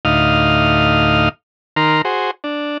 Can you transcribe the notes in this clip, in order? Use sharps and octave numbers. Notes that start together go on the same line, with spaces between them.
D2 A2 D#4 F5 D#6 F6
D#3 A#4 A#5 C6 F6
F#4 G#4 C5
D4